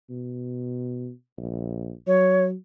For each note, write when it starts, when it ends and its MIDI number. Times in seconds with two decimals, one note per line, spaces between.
0.10 1.11 47
1.38 1.93 34
2.07 2.54 54
2.07 2.44 73